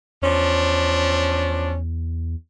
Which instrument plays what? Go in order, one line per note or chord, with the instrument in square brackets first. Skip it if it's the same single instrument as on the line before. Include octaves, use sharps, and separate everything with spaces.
[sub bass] E2 [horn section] F3 C#4 D4